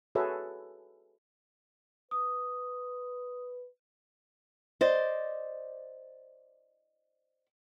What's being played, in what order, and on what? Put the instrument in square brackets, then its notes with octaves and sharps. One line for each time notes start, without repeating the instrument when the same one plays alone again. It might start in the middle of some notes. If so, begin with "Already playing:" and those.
[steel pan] F#4 G#4 A4 B4 C#5 E5
[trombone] B4 [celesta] D#6
[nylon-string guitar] C5 D5 D#5